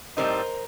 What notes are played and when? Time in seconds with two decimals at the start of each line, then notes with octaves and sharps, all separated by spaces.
0.17 A2 E3 G3 C4 D#4 A#4 C5